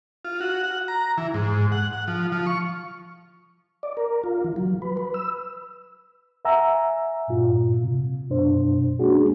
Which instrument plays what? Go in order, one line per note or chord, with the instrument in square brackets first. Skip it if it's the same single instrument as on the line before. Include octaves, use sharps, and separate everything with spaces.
[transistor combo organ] F4
F#4
F#5
A#5
E3
G#2
F#5
F#5
F3
F3
C#6
[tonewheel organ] D5
A#4
F4
E3
F#3
B4
B4
E6
[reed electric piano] E5 F#5 G#5 A#5 E6
G2 A#2 F4
C3
F#2 B2 D4 C5
G#3 A#3 C#4 D4 F#4 G#4